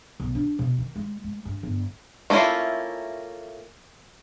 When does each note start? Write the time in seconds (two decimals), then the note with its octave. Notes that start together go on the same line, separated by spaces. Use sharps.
0.20 B1
0.35 D4
0.59 B2
0.78 D#3
0.96 G#3
1.24 G#3
1.45 G2
1.63 G1
2.30 A3 A#3 C#4 E4 F4